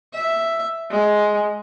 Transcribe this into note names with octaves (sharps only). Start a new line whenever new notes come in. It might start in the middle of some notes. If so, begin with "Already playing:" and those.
E5
G#3